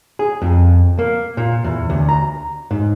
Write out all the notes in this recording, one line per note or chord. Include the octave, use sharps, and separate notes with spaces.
G#4
F2
A#3
A#2
E2
D2
A#5
G#2